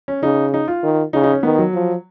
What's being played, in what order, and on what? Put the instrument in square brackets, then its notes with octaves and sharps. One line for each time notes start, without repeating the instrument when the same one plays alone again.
[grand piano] C#4
[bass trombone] C#3 [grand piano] D#4
[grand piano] D#4
F4
[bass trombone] D#3
[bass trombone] C#3 [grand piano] D#4
[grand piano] D#4
C#4
[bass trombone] D#3 [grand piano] B3
[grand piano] F#3
[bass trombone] F3